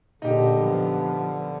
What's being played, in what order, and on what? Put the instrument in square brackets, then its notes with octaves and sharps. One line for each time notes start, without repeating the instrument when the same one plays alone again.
[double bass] A#2 [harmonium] D3 [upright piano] D#4 G4
[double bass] F3 B3